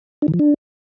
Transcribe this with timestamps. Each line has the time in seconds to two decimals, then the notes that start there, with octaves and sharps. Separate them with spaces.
0.22 D4
0.28 D#3
0.34 F3
0.39 D4